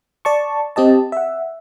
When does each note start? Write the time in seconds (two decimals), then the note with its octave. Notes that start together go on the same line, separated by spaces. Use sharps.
0.25 D5 A5 C#6
0.76 C4 G4 D#5 A5
1.12 E5 F#5